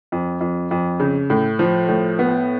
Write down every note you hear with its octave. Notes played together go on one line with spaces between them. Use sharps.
F2
F2
F2
C#3
A2
F3
A2
B3